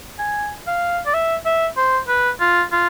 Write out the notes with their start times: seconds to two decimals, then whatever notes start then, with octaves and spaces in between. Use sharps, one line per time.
0.19 G#5
0.67 F5
1.06 D5
1.14 E5
1.45 E5
1.77 C5
2.08 B4
2.41 F4
2.72 F4